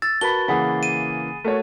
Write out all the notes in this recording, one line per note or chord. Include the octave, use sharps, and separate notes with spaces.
E6 A6
F#4 A#4 B4 A5 B5 G7
C#3 E3 A#3 G#4 F#5 B5
D#7
A3 F#4 A#4 C#5